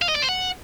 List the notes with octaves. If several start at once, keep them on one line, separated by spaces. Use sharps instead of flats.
F5
D#5
D5
C5
F#5